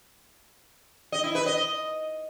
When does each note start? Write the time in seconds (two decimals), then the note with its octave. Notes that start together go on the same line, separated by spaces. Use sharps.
1.12 D#5
1.24 E4
1.35 B4
1.46 D#5